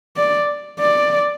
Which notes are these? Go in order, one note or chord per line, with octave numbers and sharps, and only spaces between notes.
D5
D5